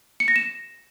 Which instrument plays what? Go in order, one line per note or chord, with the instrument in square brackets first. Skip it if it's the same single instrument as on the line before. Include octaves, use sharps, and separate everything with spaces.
[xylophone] C#7
A#6
E7